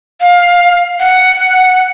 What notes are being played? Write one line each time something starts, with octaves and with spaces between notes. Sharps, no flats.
F5
F#5